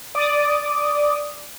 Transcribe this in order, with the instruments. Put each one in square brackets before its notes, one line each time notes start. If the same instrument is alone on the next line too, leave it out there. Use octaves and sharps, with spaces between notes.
[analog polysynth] D5 D6 D#6